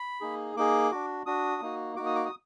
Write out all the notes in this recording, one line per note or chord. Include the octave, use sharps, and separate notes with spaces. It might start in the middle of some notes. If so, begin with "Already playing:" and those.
Already playing: B5
A#3 D#4 G#4
A#3 D#4 G#4 D6
D4 F#4
D4 F#4 D#6
A#3 D#4 F#4
A#3 D#4 F#4 D6
D#6
D6
D#6